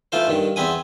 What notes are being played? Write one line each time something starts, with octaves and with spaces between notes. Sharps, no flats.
E3 A3 F4 C5
G2 D#3
E2 C4 B4 G#5 D#6